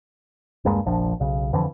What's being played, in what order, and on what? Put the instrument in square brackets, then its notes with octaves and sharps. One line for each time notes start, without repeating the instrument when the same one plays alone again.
[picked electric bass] D#1 G2 G#3 A#3
F1 A#1 F3 D4
B1 C#3
F2 D3 E3 F3